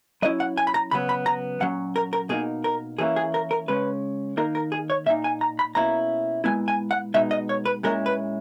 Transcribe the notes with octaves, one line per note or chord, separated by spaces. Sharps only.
F#3 C#4 E4 D#5
F#5
G#5
B5
A#5
C#3 F#3 B3 B5
B5
A#5
A#2 F#3 C#4 F#5
A#4
A#4
B2 A#3 D#4 G#4
A#4
E3 A#3 C#4 E4 G#4
G#4
A#4
A#4
C#3 G#3 C#4 B4
D#3 A#3 D#4 A#4
A#4
G#4
C#5
A#2 A#3 D#4 E5
G#5
A#5
B5
B2 A#3 C#4 E4 A#5
A#2 G#3 B3 E4 G#5
G#5
F#5
B2 G#3 D#4 E5
D#5
C#5
B4
A#2 G#3 C#4 E4 A#4
B4